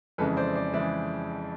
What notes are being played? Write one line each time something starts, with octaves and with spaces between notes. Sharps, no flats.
F2 C#3 E3 G#3 A4 B4
C5 D5
C5 D5
C#3 E3 G#3 D5 E5